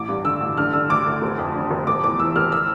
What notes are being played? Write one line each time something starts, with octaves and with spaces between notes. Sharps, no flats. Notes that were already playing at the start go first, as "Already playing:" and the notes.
Already playing: A1 D6
G2
D3 E6
A1
D3 F6
D3 E6
D2 D6
D2
F1
F2
D3
F1
F1 D6
E2 D6
E3 E6
F1 F6
E6